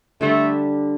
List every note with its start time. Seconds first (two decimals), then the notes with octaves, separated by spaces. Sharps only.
0.21 D3 G3 A3 D4